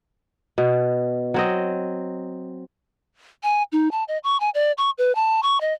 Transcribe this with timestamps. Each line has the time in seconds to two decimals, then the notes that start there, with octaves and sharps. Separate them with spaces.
0.58 B2
1.34 F#3 C4 D#5
3.43 G#5
3.72 D#4
3.92 A5
4.08 D#5
4.24 C#6
4.40 G#5
4.55 D5
4.78 C#6
4.98 B4
5.15 A5
5.43 C#6
5.61 D#5